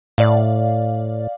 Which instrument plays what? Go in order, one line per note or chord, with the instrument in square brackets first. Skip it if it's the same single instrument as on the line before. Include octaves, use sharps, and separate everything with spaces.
[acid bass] A2 [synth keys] D5 F5